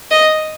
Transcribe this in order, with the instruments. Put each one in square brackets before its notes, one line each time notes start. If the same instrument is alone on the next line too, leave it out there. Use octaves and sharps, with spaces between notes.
[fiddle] D#5